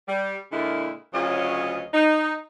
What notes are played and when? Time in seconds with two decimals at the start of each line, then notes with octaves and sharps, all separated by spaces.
0.08 G3
0.52 A#2 D3 G#3 A#3 E4
1.13 D2 C#3 F#3 C#4 F4 D#5
1.93 D#4